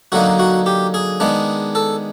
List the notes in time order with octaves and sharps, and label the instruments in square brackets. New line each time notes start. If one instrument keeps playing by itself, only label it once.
[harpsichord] D3 F#3 A#3 D#4 F#4
F#4
G4
G#4
D#3 G#3 B3 D4
A4